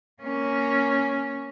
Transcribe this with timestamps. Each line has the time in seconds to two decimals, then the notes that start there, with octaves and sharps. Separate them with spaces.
0.23 A#3 C#4